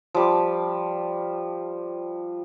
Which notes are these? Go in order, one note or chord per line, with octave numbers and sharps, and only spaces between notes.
F3 G3 D6